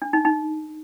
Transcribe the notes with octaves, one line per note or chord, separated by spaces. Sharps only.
D4
D#4
D#4